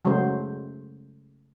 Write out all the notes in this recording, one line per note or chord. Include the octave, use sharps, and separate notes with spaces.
C#3 F#3 G#3 A3 C5